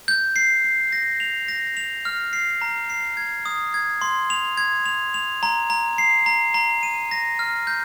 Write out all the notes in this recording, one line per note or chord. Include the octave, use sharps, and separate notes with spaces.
G6
C7
C7
A#6
F7
A#6
F7
F6
C7
A#5
C7
G#6
D#6
G#6
C6
F7
G#6
F7
F7
A#5
A#5
C7
A#5
A#5
D#7
A#6
F6
G6